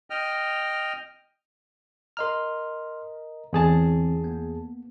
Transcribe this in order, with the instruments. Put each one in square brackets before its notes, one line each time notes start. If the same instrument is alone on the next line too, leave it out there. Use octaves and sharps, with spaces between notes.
[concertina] D#5 G5 F6
[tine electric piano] A#4 D#5 A#5 [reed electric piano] C6 F6
[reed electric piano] E2 G#4 A5 [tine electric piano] D3 E3 C4
[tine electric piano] A#3 B3